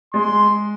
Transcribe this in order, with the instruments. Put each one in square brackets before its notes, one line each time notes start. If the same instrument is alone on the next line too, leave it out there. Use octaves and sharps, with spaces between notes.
[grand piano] G#3 [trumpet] C6